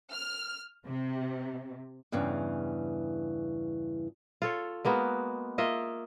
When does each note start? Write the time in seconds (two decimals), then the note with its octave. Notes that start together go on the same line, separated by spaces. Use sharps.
0.12 F6
0.85 C3
2.12 E2 G2 C#3 E3
4.42 F4 A4 C#5
4.85 G#3 A#3 B3 F#4
5.58 A#3 F4 D#5 E5